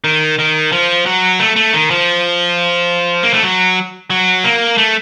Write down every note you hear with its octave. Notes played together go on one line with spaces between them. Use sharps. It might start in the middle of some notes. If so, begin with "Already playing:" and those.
D#3
D#3
F3
F#3
A3
A3
D#3
F3
A#3
A3
F#3
F#3
A#3
A3